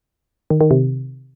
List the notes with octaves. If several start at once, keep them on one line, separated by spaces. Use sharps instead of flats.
D#3
D#3
C3